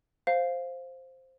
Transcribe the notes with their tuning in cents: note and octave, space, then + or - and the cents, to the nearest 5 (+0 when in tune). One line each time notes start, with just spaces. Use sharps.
C5 +0 F5 +0